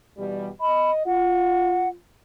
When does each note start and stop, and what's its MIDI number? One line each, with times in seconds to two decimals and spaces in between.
0.17 0.48 47
0.17 0.48 52
0.17 0.48 55
0.61 1.04 75
0.61 0.91 83
1.06 1.95 65
1.06 1.89 78